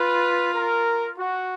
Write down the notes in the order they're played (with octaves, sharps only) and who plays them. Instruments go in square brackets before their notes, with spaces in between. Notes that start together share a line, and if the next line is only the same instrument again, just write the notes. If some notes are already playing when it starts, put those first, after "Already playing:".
Already playing: [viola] F4 [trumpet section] B4
[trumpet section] A#4
F#4